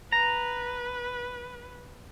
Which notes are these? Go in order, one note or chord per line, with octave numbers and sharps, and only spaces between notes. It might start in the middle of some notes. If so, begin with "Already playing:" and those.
B4 A#5